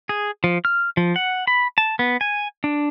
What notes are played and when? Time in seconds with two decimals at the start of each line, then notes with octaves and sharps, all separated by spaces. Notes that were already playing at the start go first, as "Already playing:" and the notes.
0.09 G#4
0.44 F3
0.65 F6
0.97 F3
1.16 F#5
1.47 B5
1.78 A5
1.99 B3
2.21 G#5
2.64 D4